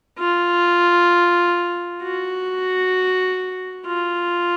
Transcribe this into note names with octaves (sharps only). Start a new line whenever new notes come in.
F4
F#4
F4